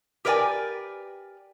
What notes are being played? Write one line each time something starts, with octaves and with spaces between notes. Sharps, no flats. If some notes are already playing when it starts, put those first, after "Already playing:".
G4 A#4 B4 D5 G5 G#5